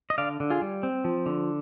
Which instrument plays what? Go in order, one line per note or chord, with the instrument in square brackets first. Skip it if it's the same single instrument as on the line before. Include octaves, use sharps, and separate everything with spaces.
[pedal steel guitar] D#5
D3 D5 F5
D3
F4 G#4
G3
C4
F3
D3